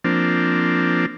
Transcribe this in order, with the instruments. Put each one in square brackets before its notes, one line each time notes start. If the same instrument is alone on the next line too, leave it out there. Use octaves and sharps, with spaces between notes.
[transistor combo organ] F3 A#3 C4 D4